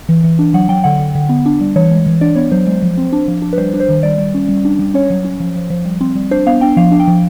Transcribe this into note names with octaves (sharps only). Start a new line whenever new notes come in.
E3
E3
D4
F#3 F#5
F#3 G5
D3 F#5
D3
D3
B3
D4
G3
E3 C#5
G#3
E3
D4 D5
B3 C#5
F#3 C5
G#3
F3
C4
D4
F3
D4
B4
G3 C5
D4
C5
D#3
G3 D5
G3
C#4
G3
D4
G3
C#4 C#5
F#3
C#4
F3
F3
F3
G3
C4
G3
D4 C5
B3 F5
D4 G5
F3 F5
D4
G5
F3